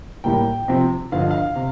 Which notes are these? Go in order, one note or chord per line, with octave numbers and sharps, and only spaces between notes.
A2 G3 A#3 G5
C3 F3 C4
G2 D3 F3 F5
D#5
F5
C3